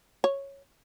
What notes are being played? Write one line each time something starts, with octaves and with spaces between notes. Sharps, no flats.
C#5